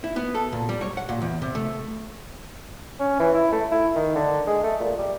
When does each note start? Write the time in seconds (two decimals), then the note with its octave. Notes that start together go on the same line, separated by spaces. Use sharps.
0.04 E4
0.16 B3
0.35 A4
0.53 A#2
0.69 G3
0.81 C#5
0.97 F#5
1.09 A#2
1.22 E2
1.42 C3
1.55 A3
3.00 C#4
3.20 E3
3.34 E4
3.52 A3
3.72 E4
3.95 D#3
4.15 D3
4.47 G#3
4.63 A3
4.81 A#2
4.98 G3